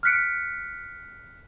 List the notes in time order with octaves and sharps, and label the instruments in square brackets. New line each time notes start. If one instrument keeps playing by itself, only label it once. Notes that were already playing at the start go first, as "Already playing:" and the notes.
[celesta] F6 F#6 B6 C#7 D7